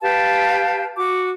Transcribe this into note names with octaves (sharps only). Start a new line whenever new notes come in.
G4 B4 F5 A5
F#4 D6